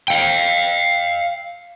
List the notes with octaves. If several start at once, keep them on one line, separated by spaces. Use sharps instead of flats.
F5 G5